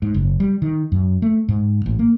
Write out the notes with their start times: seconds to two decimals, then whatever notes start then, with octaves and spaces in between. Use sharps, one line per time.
0.02 G#2
0.14 F#1
0.40 G3
0.62 D#3
0.92 F#2
1.22 A3
1.48 G#2
1.86 A1
1.99 A#3